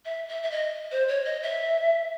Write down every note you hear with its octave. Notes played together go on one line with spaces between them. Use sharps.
E5
E5
E5
D#5
C5
C#5
D#5
E5